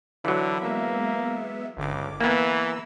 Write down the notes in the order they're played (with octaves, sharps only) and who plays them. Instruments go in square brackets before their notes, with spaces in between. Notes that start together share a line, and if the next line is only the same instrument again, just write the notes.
[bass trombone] D3 [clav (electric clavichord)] E3 F#3 [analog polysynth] B5
[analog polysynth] G#3 B3 E5 [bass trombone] A#3
[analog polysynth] G1 D3 D6 [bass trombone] C#2
[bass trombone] E3 [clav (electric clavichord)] A#3 B3 [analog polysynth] A#5 E6